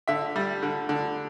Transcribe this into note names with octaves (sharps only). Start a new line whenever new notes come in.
D3 E5
G3
D3
D3